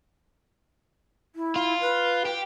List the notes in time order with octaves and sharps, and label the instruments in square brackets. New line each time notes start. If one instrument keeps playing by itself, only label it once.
[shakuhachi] E4
[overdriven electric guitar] F4
[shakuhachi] B4
[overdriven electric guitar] G4